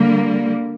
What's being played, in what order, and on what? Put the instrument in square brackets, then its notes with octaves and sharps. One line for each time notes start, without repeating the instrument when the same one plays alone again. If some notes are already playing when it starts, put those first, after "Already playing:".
Already playing: [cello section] D3 G3 A#3